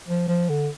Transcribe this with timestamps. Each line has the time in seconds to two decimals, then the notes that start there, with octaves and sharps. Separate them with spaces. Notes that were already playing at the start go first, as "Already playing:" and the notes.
0.08 F3
0.28 F3
0.49 D3